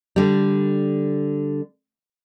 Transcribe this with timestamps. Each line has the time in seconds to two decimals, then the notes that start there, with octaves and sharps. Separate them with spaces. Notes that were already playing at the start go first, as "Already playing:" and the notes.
0.16 D3 G3